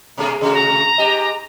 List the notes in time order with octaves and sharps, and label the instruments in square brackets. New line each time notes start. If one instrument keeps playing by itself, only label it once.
[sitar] B2 A3 G#4
C3 A3 F#4
[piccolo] A#5
[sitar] G#2 G4 D#5